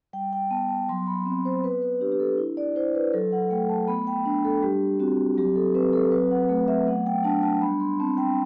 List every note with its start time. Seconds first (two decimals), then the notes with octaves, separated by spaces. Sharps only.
0.13 G3 G5
0.33 G5
0.51 B3 A5
0.70 A5
0.89 F#3 C6
1.07 B5
1.26 C4
1.45 C5
1.64 B3 B4
1.82 B4
2.01 D4 G4
2.12 G4
2.20 A4
2.38 E4
2.57 D5
2.76 E4 C5
2.95 B4
3.13 F#3 A4
3.32 F#5
3.51 A3 G5
3.69 A5
3.88 B3 B5
4.07 G5
4.25 D4
4.45 A4
4.62 G3 G4
5.00 C4 F#4
5.38 F#3 G4
5.56 A4
5.74 C4 B4
5.93 A4
6.12 F#3 B4
6.31 F#5
6.49 A3
6.68 E5
6.87 B3 F#5
7.06 G5
7.24 D4 A5
7.43 A5
7.62 G3 B5
7.80 C6
8.00 C4 A5
8.18 G5